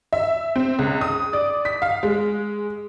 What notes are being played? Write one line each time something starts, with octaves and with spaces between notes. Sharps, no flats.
E5
C4
C#2
D#6
D5
B6
F5
G#3